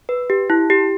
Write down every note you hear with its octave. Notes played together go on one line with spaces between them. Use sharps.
B4
G4
E4
G4